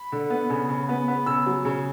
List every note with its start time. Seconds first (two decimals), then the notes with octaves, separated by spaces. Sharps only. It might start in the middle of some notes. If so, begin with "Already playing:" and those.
Already playing: B5
0.12 D3
0.30 B3
0.50 C#3
0.69 C#3
0.89 B3
1.08 B3
1.26 C#3 E6
1.46 F#3
1.65 C#3